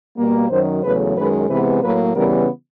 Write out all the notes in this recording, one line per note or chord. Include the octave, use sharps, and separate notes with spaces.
B2 G3 A#3
F#2 D#3 F#3 C5
E2 C#3 F#3 A3 B4
F#2 D#3 G#3 B4
C3 E3 G#3 B3 B4
A2 F#3 A#3 B4
C#3 E3 G3 B3 A#4